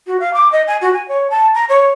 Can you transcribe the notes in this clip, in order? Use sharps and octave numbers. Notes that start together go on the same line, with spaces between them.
F#4
F5
D6
D#5
G#5
F#4
G#5
C#5
A5
A#5
C#5